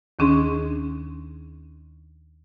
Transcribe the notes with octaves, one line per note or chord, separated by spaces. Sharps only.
D#2 D#3 C#4 D4 G#4 C6